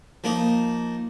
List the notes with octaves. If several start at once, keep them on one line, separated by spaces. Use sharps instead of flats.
F3 A#3 D#4